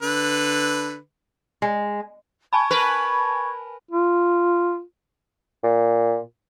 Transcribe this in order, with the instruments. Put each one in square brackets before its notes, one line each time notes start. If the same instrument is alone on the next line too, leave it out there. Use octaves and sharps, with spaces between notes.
[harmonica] D3 B4
[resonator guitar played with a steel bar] G#3
[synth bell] G#5 A5 B5 [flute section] C#6 G#6
[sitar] A#4 B4
[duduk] F4
[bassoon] A#2